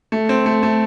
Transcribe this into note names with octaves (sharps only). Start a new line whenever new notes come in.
A3
C4
A3
A3